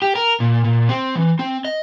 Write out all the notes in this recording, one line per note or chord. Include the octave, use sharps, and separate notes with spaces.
G4
A#4
A#2
A#2
C4
E3
C4
D#5